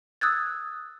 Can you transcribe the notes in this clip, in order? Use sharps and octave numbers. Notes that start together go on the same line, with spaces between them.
D#6 E6 F#6 G#6 A6